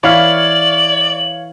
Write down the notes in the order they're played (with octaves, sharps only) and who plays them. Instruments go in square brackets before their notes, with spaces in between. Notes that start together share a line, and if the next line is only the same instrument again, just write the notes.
[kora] E3 [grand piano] C#5 F5 F6 [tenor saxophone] D5 [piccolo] F#7